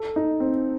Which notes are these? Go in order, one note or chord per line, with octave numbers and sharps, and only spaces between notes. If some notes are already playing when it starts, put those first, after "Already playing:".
Already playing: A4
D#4
C4